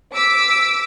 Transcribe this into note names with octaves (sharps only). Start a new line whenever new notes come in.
D6 E6 B6 D7